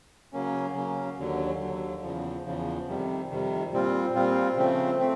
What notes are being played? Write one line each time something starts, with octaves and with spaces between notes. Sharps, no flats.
C#3 F#3 A#3 C#4
C#3 F#3 A#3 C#4
D#2 D3 F#3
D#2 D3 F#3
E2 C#3 F3
E2 C#3 F3
F2 C3 D#3 G3
F2 C3 D#3 G3
A#2 G3 C4 F4
A#2 G3 C4 F4
C#3 F3 A3 C4
A3 C4